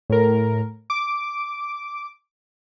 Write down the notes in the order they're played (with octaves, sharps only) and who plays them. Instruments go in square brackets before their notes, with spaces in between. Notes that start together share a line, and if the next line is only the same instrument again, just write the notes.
[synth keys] A2 A#4
D6